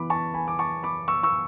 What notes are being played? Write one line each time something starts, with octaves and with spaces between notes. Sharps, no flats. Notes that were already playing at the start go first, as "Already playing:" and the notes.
Already playing: E3 B3 E4 B5 D6
A5 C#6
G#5 B5
D6
A5 C#6
B5 D6
C#6 E6
C#6 E6